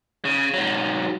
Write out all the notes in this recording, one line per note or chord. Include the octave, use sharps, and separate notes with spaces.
C#3
G#2 F#3